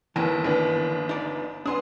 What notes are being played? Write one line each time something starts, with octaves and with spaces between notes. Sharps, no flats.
G1 D#3 E3 A#3 A5
G1 B3 D4
D#4 D5
B3 C#4 D4 C6 D#6